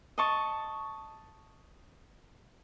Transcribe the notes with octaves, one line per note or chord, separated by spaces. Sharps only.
D#5 A5 C#6